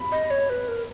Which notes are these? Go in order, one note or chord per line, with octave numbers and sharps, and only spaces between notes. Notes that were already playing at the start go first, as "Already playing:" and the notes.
Already playing: B5
D#5
C#5
B4
A#4